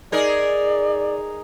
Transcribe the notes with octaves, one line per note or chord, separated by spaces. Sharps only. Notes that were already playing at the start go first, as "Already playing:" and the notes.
D#4 G#4 A#4 D5